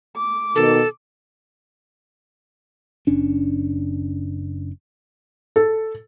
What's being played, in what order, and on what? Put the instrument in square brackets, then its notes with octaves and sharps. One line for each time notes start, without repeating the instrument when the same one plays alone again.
[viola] D6
[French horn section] B2 D#3 [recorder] A4
[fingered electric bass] F#1 C#4 D4
[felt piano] A4